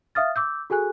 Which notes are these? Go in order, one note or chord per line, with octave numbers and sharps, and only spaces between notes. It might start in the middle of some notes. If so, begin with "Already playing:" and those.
E5 F5 D#6 F6 A6
D6 E6 G6
F#4 G#4 A4 G#5 F#6